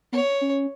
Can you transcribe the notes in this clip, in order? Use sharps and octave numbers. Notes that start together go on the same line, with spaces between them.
B3 C#5
C#4